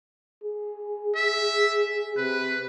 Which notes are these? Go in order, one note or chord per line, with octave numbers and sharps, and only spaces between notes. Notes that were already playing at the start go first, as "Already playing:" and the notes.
G#4
E5
C3 B4